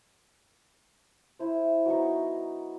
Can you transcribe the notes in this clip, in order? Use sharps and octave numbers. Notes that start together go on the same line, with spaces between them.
E4 C5
F#3 B3 D#4 C#6